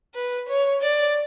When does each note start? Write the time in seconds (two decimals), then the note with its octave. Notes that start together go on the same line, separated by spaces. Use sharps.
0.15 B4
0.49 C#5
0.82 D5